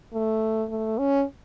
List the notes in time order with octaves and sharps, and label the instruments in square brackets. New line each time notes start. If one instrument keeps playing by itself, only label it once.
[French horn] A3
A3
C#4